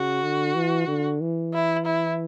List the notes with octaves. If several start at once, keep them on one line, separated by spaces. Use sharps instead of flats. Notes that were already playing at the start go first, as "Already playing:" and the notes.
Already playing: C#3 F#4
D3
E3
D3
E3
E4
E4